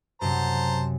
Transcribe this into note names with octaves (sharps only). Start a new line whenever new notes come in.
F#2 C3 C5 A5 A#5